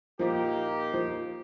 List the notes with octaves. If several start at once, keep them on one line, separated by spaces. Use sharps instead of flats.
A#2 F3 A#3 D#4 G4
F3